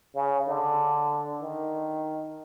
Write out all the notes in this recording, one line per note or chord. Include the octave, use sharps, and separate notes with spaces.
C#3
D3
D#3